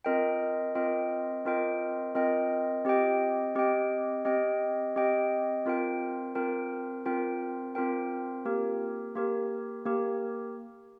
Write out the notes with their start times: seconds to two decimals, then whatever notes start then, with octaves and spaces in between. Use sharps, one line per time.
0.05 C4 F4 A#4 D#5 G5
0.75 C4 F4 A#4 D#5 G5
1.45 C4 F4 A#4 D#5 G5
2.15 C4 F4 A#4 D#5 G5
2.85 C4 G4 D#5 G5
3.55 C4 G4 D#5 G5
4.25 C4 G4 D#5 G5
4.96 C4 G4 D#5 G5
5.66 C4 F4 A#4 G5
6.35 C4 F4 A#4 G5
7.06 C4 F4 A#4 G5
7.75 C4 F4 A#4 G5
8.45 A#3 G4 A#4
9.15 A#3 G4 A#4
9.86 A#3 G4 A#4